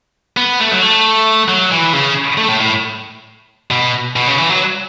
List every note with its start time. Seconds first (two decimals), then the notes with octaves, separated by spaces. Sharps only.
0.37 B3
0.60 A3
0.71 F#3
0.82 A3
1.49 F#3
1.72 E3
1.93 C#3
2.38 A3
2.48 A2
2.60 A2
3.71 B2
4.16 B2
4.27 C#3
4.38 E3
4.50 F#3